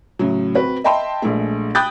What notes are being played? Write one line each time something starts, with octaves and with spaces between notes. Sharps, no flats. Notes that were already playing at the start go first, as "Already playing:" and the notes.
A2 C#3 F#3
C4 F#4 B4
D#5 E5 G5 A5 B5 C6
A#1 G#3 A3
G5 B5 D#6 F#6 G6 A6